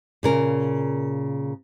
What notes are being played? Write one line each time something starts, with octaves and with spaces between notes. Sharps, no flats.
A#2 C#3 A#4